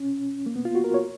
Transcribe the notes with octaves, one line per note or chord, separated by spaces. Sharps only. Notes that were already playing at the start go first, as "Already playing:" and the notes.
Already playing: C#4
A#3
B3
F4
F#4
A#4
C#5